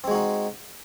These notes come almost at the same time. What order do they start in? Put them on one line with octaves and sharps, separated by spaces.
C4 G#3 F#4 D#4